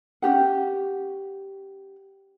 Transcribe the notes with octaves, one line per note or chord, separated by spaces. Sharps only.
C#4 F#4 G4 F#5